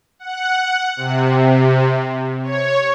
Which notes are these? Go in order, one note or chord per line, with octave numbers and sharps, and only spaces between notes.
F#5
C3
C#5